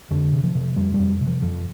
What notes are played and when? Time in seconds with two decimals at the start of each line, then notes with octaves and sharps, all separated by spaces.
0.11 F2 D3
0.33 C3
0.44 F3
0.55 C3
0.76 F2 G3
0.94 G3
0.99 F2
1.21 C3
1.27 F3
1.42 F2 F3